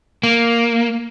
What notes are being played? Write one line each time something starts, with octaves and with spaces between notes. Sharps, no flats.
A#3